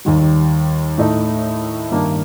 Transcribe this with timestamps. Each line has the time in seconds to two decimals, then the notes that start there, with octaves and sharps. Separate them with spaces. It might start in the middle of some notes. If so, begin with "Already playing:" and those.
0.05 D#2 D#3 G3
0.98 A2 A3 D#4
1.91 G2 D#3 A#3 D4